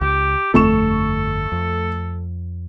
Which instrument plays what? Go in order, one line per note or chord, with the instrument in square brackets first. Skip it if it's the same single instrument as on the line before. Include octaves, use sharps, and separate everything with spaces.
[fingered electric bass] C#2 [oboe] G4
[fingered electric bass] G1 F2 D3 [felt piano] A3 C#6 E7 [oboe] A4
[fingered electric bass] F2